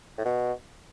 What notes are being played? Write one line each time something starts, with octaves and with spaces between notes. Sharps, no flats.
A2
B2